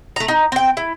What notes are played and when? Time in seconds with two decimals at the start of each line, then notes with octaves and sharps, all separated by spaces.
0.16 A3 A#5
0.28 D#4
0.52 C4 G5
0.77 E4